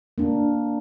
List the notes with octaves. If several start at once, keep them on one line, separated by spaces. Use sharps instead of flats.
A#3 D4